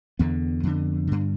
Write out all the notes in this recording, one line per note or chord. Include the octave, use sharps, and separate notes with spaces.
E2 D3 B3
F2 D3
G2 D3